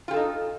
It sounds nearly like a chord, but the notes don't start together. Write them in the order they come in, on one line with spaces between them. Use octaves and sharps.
F4 G4 A4 D#4